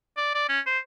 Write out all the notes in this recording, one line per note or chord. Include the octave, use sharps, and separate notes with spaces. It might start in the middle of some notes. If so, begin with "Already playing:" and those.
D5
D5
C#4
C5